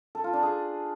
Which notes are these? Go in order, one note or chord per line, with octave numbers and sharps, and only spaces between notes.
A4
F4
D4
G#4